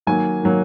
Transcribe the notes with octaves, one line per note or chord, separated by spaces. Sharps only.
D#3 F#3 A#3 G#5
D#3 F#3 A#3